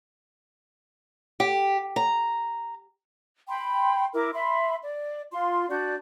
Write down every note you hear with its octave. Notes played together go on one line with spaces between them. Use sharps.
G4
A#5
G5 B5 C6
E4 A#4 D6
E5 B5 C6
D5
F4 C6
D4 F#4 D5 G6